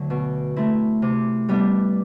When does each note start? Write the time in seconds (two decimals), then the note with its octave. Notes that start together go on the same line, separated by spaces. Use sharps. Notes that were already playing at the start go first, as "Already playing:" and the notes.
Already playing: D2 D3 F#3
0.10 B2
0.56 A3 C4 E4
1.02 C3
1.49 G3 B3 D4